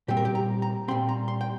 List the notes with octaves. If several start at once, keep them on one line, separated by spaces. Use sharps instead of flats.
A#2 G3 C4 G4
A#4
G4
A#5
A#5
A#2 G3 C4 C6
A#5
C6
G5